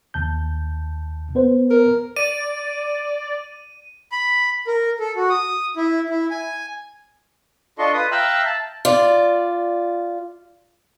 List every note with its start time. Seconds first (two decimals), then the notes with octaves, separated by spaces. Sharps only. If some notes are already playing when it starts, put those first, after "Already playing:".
0.14 D#2 A5 G6
1.35 B3 B4 C5
1.71 A#4
2.16 D5 D#7
4.12 B5
4.67 A#4
5.00 A4
5.16 F#4
5.30 D#6
5.77 E4
6.10 E4
6.31 G#5
7.78 D4 F4 A4 D#5 C6 C#6
7.94 F4 B4 D#6
8.11 E5 F5 G5 A#5 E6 F#6
8.46 A5
8.85 F4 D5